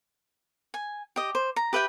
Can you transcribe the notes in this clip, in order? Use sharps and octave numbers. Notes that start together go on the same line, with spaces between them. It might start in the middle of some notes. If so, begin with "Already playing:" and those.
G#5
G4 D#5
C5
A#5
G4 B4 E5 G5